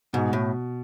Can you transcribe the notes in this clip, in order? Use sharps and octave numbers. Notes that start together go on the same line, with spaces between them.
G#2 B2
A2